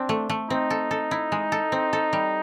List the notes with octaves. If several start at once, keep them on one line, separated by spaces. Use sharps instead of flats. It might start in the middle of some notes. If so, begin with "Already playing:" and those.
Already playing: C4 D4
A3
A3
C4 D#4
A4
A4
E4
G#3
A4
C4
A4
G3